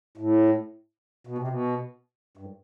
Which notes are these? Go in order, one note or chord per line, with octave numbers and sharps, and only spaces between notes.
A2
B2
C3
B2
G2